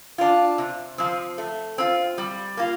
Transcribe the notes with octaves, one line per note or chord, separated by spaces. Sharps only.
D4 F4
C3
F3 C4
A3
C4 F4
G3
A#3 F4